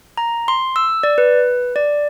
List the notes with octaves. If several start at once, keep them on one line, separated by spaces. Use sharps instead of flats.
A#5
C6
E6
D5
B4
D5